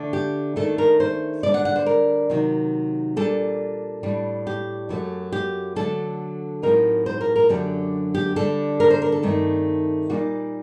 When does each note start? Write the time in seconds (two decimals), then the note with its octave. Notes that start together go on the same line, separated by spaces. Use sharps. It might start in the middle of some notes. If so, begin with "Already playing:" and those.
Already playing: D3 A3 D4
0.13 G4
0.56 D#3 A3 D4 A4
0.78 A#4
1.00 C5
1.43 D3 G3 D4 D5
1.54 F#5
1.65 F#5
1.76 C5
1.86 A#4
2.30 C3 D#3 F#3
3.16 A#2 G3 D4 A4
4.03 A2 G3 D4
4.47 G4
4.89 F#2 F#3 A3
5.33 G4
5.76 D3 F#3 A3 A4
6.62 A2 F#3 C4 D#4 A#4
7.06 C5
7.21 A#4
7.36 A#4
7.49 F#2 D3 F#3 A3 D4 G4
8.14 G4
8.36 D3 G3 D4 A4
8.80 A#4
8.90 C5
9.02 A#4
9.12 A4
9.23 G2 D#3 A3 C4 D#4
10.10 A#2 G3 A#3 D#4 F#4